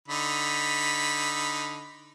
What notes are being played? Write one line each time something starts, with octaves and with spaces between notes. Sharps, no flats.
D3 D#4 B5